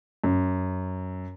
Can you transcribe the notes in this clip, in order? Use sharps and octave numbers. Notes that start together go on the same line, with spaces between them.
F#2